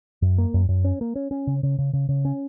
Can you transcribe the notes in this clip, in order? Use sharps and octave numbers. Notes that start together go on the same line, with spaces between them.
F#2
A#3
F#2
F#2
C#4
A#3
C#4
C#4
C#3
C#3
C#3
C#3
C#3
C#4